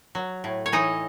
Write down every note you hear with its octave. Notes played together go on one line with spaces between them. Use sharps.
F#3
A2
C#5
E3 D#4 D#5